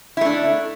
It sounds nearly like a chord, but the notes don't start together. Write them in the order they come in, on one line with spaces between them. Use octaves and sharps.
E4 A3 D4